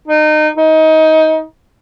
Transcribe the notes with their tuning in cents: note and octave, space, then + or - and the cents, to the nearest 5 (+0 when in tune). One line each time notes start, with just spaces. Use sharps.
D#4 -25
D#4 +25